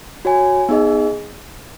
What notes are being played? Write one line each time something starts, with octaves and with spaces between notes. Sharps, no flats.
F#4 C#5 G#5
B3 D#4 G#4 D#5